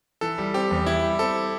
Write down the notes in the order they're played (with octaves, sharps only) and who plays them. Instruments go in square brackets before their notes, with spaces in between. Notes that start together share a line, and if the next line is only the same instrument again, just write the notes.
[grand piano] E3 [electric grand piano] A4
[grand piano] G3
[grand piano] C4 [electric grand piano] G4
[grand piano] E2
[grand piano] E3 [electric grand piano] E4
[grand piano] G3
[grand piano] C4 [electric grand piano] A4